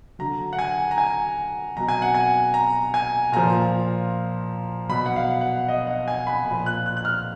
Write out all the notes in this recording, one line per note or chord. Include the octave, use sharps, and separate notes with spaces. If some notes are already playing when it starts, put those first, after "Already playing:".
D3 F#3 A#5
F#5
G#5
A#5
G#5
B2 F#3 A#5
G#5
F#5
G#5
A#5
G#5
A#2 F3 A#5
B2 F#3 B5
F#5
F5
F#5
D#5
F#5
G#5
B5
A#2 B5
F3
F#6
F#6
F#6
F6